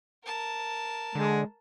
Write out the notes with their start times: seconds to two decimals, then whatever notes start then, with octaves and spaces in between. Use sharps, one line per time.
0.25 A#4 A5
1.15 D3 G#3